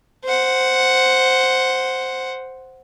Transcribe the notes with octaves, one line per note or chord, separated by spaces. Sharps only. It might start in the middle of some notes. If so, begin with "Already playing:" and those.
C5 F#5